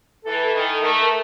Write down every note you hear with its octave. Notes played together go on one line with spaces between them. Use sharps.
E3 A4
D#3 A4
A3 A#4
A4